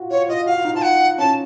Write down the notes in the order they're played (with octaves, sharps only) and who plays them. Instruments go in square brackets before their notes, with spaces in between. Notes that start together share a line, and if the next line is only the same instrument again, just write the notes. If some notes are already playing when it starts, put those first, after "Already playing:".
Already playing: [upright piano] F4 F#4
[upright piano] F4 [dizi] C#5
[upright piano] F4 [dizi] D#5
[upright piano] F#4 [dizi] F5
[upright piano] F4
D#4
[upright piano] F4 [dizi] A5
[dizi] F#5
[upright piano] C#4 [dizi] A5